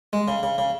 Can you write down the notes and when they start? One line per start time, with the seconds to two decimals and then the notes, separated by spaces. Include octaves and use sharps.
0.13 G#3
0.28 C#3
0.43 C#3
0.58 C#3